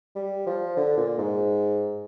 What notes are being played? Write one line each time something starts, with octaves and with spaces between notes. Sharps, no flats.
G3
F3
D3
A#2
G#2